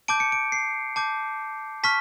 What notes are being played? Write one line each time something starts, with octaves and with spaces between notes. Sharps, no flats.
A5 D6 G6 D7
C#7
D7
C7
A5 D6 G6
A5 C#6 F6 B6